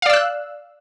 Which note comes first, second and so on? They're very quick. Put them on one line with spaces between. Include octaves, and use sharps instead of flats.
F5 D5 E6 F#6